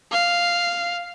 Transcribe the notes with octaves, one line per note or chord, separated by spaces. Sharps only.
F5